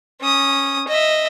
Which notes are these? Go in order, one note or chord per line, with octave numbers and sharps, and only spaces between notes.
C#4 D#6
D#5 E5